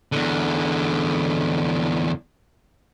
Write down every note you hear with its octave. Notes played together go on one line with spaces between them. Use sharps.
E2 D3